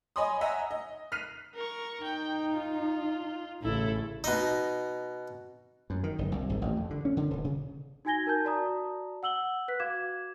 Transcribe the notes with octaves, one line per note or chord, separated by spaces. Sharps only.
C#5 D#5 G#5 B5 C6 D#6
D#5 E5 F#5 G#5 A#5
D#5
F6 F#6 B6 C7 D#7 F7
A#4 C#6
D#4 G5
F4
A1 C#3 E4 A4
B2 D#4
F#2
D#3
F#1
C2
G#1
A1
F2
D3
C#4
D3
D#1
C#3
D#4 F#4 G#5 G#6 A#6 G7
D#4 A#4 A5 G6
F#4 D5 A5 A#5 D#6
F#5 E6 F#7 G7
B4 F#6 B6
F#4 F5 D6 G#6 E7